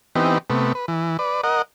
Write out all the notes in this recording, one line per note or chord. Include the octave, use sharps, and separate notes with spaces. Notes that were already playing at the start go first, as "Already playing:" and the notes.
E3 B3 C4 D#4 G4
C3 A3 B3
B4
E3
B4 D5
A#4 D#5 F#5